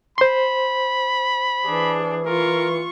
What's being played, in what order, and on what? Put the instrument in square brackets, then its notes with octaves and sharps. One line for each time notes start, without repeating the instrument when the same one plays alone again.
[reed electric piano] C5 C6 [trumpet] B5
[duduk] E3 [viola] D4 G#4
[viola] F4 C#6 [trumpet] A#4